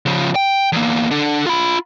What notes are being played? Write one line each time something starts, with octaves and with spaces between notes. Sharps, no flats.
C#3 F3
G5
E2 A#3
D4 A4
F4 B5